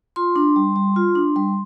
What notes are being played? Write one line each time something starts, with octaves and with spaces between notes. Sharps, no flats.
F4 C6
D4
G3
G3
F4
D4
G3